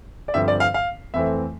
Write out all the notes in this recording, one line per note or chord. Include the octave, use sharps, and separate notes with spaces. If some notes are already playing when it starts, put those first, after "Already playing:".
D5
G2 D3 F3 C4 E5
D5
F5
F5
F2 E3 A3 C4 E5